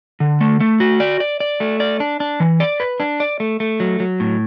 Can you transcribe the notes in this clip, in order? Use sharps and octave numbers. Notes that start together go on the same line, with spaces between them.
D3
A3
A3
F#4
D5
D5
D5
A3
D5
D4
D4
E3
D5
B4
D4
D5
A3
A3
F#3
F#3
A2